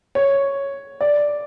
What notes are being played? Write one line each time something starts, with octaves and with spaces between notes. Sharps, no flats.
C#5
D5